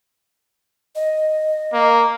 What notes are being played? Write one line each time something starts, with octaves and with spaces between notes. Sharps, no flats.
D#5
A#3